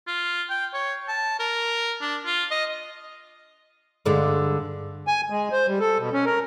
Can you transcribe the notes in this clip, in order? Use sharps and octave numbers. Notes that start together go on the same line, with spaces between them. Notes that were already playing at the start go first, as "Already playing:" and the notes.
F4
G5
C#5
A5
A#4
D4
F4
D#5
G2 D3 G#3
G#5
G#3
C5
G3
A4
B2
C#4
A#4